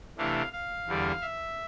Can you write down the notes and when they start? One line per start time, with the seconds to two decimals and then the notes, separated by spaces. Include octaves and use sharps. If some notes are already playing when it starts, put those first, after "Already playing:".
0.17 C3 E3 A3 D4 F5
0.53 F5
0.87 E2 D3 G3 D4
1.22 E5